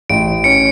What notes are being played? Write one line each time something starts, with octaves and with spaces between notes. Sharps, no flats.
A1 D7
C#4 C#7